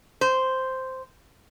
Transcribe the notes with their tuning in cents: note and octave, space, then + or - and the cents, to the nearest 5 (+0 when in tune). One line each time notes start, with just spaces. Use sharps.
C5 -5